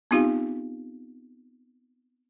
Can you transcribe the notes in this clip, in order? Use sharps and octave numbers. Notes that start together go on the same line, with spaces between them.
B3 C4 D#4 F4 G4 F5